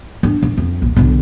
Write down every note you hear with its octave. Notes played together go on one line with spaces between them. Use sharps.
D4
G#2
F2
A#1
B1 D3